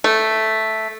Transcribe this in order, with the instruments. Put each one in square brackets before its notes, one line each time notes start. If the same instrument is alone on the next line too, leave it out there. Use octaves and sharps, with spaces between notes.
[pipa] A3